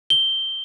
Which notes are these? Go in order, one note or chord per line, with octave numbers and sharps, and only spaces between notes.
G7